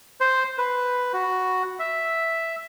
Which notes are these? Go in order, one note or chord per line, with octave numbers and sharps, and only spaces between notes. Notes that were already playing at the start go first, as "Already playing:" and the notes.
C5
B4
F#4
E5